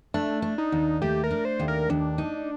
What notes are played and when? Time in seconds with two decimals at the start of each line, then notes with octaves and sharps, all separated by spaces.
0.14 A3 D4
0.42 D4
0.58 D#4
0.72 D#2
1.02 A3 G4
1.24 A#4
1.31 D4
1.45 C5
1.59 D#2
1.68 A#4
1.90 D#2 D4
2.18 D#4